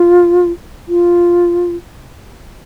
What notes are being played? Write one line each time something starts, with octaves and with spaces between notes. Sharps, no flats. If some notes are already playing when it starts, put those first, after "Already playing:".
Already playing: F4
F4